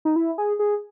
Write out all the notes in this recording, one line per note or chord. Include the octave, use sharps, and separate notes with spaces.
D#4
E4
G#4
G#4